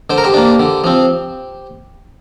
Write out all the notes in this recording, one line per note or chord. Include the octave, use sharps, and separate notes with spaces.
D3 C5
A#4
G4 C5
A#3 D4
D3
F3 C4